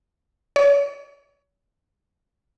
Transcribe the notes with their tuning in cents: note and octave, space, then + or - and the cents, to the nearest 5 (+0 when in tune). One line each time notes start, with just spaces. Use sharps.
C#5 +35